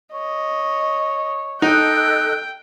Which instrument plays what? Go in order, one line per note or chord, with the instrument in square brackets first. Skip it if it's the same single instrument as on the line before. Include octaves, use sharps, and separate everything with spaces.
[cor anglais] C#5 [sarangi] D#5
[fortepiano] D#4 [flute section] A4 D#5 F#6 [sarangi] G5